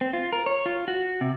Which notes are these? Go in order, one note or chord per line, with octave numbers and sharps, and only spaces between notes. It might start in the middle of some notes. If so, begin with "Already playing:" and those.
C4
F4
A#4
C#5
F4
F#4
C3